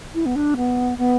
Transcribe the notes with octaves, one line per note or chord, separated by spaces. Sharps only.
E4
B3
D4
B3
B3